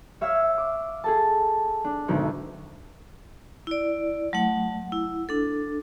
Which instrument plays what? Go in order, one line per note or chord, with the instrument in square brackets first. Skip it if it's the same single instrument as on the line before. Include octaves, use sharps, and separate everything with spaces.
[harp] C#5 E5 F5 E6 F6 G#6
D6
G#4 A4 A5
D4
G#1 D2 B2 F#3 D#4
[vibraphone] E4 D5
F#3 A3 F#5
E4
D4 A4